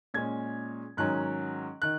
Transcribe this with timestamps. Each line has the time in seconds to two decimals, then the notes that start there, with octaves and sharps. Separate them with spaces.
0.14 A#2 G#3 C#4 G#6
0.97 G#2 D#3 F#3 C#4 F#6
1.82 D#3 F#6